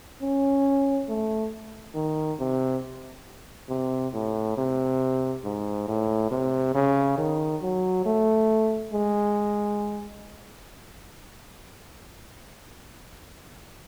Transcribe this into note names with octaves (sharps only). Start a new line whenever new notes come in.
C#4
A3
D#3
C3
C3
A2
C3
G#2
A2
C3
C#3
D#3
F#3
A3
G#3